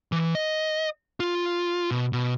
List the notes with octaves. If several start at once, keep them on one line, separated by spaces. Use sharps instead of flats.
E3
D#5
F4
B2
B2